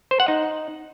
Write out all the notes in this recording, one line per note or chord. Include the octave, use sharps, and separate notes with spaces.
C5
F#5
D#4